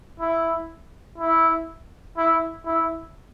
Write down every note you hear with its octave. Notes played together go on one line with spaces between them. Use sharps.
E4
E4
E4
E4